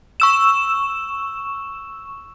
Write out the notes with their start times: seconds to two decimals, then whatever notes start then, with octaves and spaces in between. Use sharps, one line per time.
0.20 C#6 E6 E7